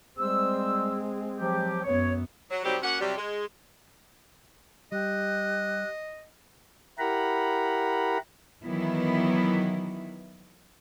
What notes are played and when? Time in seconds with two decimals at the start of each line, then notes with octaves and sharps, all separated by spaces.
0.19 G3 G#3 C4 C5 E6
1.39 F3 F#3 G4
1.84 F#2 B3 C#5
2.51 F#3
2.64 C3 D#3 F#3 G3 C4 G4
2.82 A#3 C#4 F#4 F#5
3.01 C3 F#3 G3
3.17 G#3
4.92 G3 G4 D#5 F#6
6.99 E4 G4 A#4 F#5 A#5 B5
8.64 D#3 E3 F#3 B3 E4